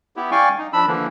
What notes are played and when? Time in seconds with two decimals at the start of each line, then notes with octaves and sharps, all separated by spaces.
0.16 B3 E4 G4
0.32 D5 F5 G5 G#5 C#6
0.58 D#4
0.73 F3 D4 B5 E6
0.87 D3 E3 F3 A#3